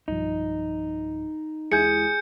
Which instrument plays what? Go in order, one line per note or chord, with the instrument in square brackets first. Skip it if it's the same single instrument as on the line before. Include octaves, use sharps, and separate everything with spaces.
[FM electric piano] B1 G2 F3 [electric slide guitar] D#4
[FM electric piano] E2 G#3 E4 [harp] G#4 [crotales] G6 C#7